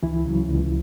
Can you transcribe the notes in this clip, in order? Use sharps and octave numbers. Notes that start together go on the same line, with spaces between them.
C#2 E3 E4
C#3 F#3
C#2